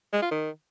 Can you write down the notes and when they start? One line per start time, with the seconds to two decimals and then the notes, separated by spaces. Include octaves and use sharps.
0.13 G#3
0.22 F4
0.31 D#3